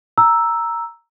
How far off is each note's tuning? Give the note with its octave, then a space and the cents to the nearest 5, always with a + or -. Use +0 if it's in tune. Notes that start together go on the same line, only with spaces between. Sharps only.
A#5 +0 E6 +0